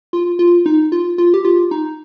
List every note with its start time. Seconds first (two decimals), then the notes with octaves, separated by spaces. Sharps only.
0.13 F4
0.39 F4
0.66 D#4
0.92 F4
1.18 F4
1.34 G4
1.45 F4
1.71 D#4